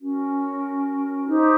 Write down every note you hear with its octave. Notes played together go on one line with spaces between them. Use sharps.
C#4 F#4 A#4
D#4 G4 C5